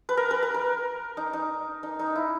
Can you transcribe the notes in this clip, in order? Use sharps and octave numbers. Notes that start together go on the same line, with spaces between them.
B4
A#4
B4
A#4
A#4
D#4
D#4
D#4
D#4
E4